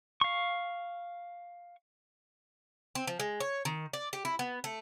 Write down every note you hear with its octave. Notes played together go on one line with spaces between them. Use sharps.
F5 C#6
C4
F3
G#3
C#5
D#3
D5
G4
E4
B3
A3